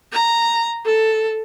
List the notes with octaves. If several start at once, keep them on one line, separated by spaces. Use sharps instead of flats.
A#5
A4